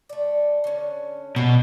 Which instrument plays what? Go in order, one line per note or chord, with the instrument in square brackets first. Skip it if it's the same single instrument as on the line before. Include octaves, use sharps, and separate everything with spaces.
[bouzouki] A3 D5
D3 C#4
[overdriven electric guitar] B2 [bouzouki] G3 F5